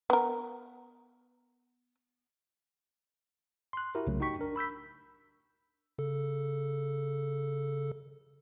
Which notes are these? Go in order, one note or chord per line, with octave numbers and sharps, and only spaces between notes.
B3 A#4
C6 F#6
E4 F#4 G4 A#4
C2 C#3 F#3 A3
D#4 F#4 G4 G5 C#6 B6
D4 A#4
B5 E6 G6 B6
C#3 A4